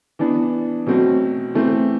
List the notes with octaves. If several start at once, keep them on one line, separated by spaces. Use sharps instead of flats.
E3 B3 D4
B2 F#3 A3 C4
E3 A3 C4